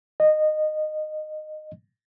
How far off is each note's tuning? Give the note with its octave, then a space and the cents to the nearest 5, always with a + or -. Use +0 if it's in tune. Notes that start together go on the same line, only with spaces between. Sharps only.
D#5 -15